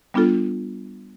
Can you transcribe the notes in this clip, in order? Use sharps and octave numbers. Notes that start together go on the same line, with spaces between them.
G3 B3 D4 F4 A4